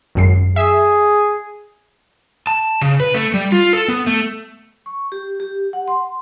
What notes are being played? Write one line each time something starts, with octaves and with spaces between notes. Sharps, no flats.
G#1 F#2 C7
G#4 E5
A5
C#3
B4
A3
G3
F4
A4
B3
A3
C#6
G4
G4
F#5
C6